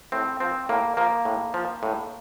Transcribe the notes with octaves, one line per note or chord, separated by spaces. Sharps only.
A2 C4
F3 C4
A2 A#3
F3 A#3
A2
F3
A2